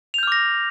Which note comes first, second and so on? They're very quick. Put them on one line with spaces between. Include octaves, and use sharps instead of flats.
F7 G6 F6 D6 A#6